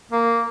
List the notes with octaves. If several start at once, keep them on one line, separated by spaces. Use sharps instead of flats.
A#3